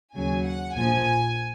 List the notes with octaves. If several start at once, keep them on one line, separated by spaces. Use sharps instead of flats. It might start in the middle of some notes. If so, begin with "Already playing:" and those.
D#2 C#3 F#3 G#5
F#5
A#1 A#2 F3 G#5